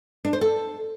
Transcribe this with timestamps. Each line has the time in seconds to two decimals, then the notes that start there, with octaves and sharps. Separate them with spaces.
0.25 D4
0.33 C5
0.41 A4